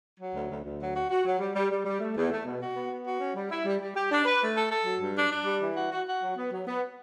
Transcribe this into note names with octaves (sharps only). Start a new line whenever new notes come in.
F#3
D2
D2
D2
F#3
F#4
F#4
F#3
G3
G3
G3
G3
A3
E2
A3
B2
F#4
B3
B3
F#4
C#4
G3
E4
G3
G3
G4
D4
B4
A3
A4
A4
F#3
G2
D4
D4
G3
E3
F#4
F#4
F#4
F#3
B3
F#3
B3